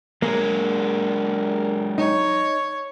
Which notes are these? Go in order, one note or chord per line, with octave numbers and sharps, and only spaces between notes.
F#3 G#3 A#3 D4 G#4 A#4
D#4 C#5